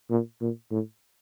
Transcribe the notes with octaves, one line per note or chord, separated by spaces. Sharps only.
A#2
A#2
A2